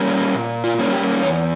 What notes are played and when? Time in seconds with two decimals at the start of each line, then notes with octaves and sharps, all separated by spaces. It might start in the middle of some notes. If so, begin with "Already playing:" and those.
Already playing: G3 A#3 C#4
0.35 A#2
0.64 F4
0.79 G3 A#3 C#4
0.93 G4
1.22 E2 C#5